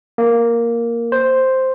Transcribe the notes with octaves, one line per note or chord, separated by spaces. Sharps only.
A#3
C5